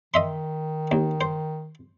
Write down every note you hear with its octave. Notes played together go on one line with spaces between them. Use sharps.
D#3 D#5 E5 C6
D#2
C5